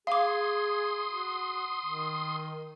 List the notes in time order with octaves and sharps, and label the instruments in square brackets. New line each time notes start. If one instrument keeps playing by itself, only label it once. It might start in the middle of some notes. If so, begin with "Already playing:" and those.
[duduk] G#4 [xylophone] F5 D6 [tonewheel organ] C6 D#6
[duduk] F#4
D#3